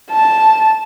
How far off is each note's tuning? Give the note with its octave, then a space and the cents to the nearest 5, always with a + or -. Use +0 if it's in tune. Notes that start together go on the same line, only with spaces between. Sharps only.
A5 -5